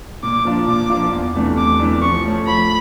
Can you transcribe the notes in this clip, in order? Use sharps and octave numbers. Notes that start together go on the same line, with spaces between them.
A#2 D6
F3 A#3 D4 F4
A#2 D6
F3 A#3 D4 F4
E2
C3 E3 A3 D4
E2 D6
C3 E3 A3 D4
F3 C#6
A3 C#4
F3 B5